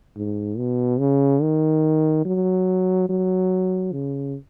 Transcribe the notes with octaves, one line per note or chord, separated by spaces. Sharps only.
G#2
B2
C#3
D#3
F#3
F#3
C#3